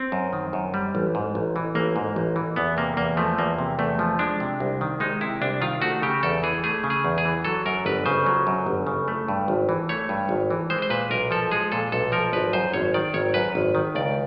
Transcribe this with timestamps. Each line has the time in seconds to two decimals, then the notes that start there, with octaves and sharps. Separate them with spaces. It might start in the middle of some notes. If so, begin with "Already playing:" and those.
Already playing: C4
0.12 F#2
0.33 D#3
0.53 F#2
0.74 G3
0.95 A1
1.15 G#2
1.35 A1
1.56 E3
1.75 A1 A#3
1.96 G#2
2.16 A1
2.36 E3
2.56 E2 B3
2.77 C3 A#3
2.97 E2 A#3
3.17 F3 A3
3.38 E2 A#3
3.58 C3
3.79 E2 A3
3.99 F3
4.19 G#3 D4
4.40 C3
4.60 C2
4.81 D#3
5.00 G#3 D#4
5.21 C3 E4
5.41 C2 D4
5.61 D#3 F4
5.82 A3 F#4
6.02 C#3 G4
6.23 E2 A4
6.43 E3 G#4
6.64 A3 G#4
6.84 C#3
6.90 G#4
7.05 E2
7.18 G#4
7.25 E3
7.45 F#3 A4
7.66 F#2 A#4
7.86 G1 B4
8.06 C#3 C5
8.26 F#3
8.47 F#2
8.66 G1
8.87 C#3
9.08 A3
9.28 G2
9.48 G#1
9.69 E3
9.89 A3 C#5
10.09 G2
10.29 G#1
10.50 E3
10.70 G#3 C5
10.82 C5
10.90 A#2 B4
11.11 B1 A#4
11.31 F3 A4
11.51 G#3 G#4
11.72 A#2 A4
11.92 B1 A4
12.12 F3 A#4
12.33 G#1 B4
12.53 F#2 C5
12.74 G#1 C#5
12.94 D#3 D5
13.14 G#1 C#5
13.34 F#2 B4
13.55 G#1
13.75 D#3
13.95 C#2 D5